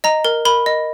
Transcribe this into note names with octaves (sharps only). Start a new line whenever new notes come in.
D#5 A#5
A#4
A#4 B5
D#5